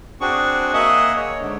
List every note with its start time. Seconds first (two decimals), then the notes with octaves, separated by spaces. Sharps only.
0.21 C4 D4 F#4 G#4 C#6
0.73 A#3 G#4 D#5 E5 F#5
1.16 C#5
1.39 G#2 D3